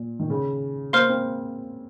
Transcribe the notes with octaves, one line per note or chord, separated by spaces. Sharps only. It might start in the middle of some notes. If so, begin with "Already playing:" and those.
Already playing: A#2
D#3
C#3
A#3 C5 F5 C6 F6
C4